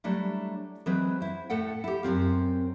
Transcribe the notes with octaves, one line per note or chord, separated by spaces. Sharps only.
F#3 G3 A3 D4 E4
E3 F#3 G#3 C4 G#4 B4
E4 C5
A2 A3 A4 F#5 G5
E4 G4
F#2 C#3 C4 F4